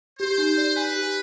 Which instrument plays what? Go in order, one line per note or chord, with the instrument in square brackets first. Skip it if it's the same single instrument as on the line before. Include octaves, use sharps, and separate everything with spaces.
[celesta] G4 [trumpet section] C5
[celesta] D#4
D5
[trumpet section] B4 [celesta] G#5
[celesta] G4